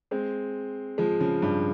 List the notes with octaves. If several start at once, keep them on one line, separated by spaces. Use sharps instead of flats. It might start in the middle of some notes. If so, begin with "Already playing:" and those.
G#3 C4
F3 G#3
C#3 F3
G2